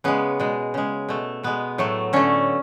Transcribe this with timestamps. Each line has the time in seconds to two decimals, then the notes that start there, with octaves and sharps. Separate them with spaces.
0.04 C#3 G#3 B3
0.40 B2 G#3
0.74 C#3 G#3
1.09 B2 A3
1.43 B2 G#3 B3
1.78 A2 F#3 A3
2.13 D3 A3 C#4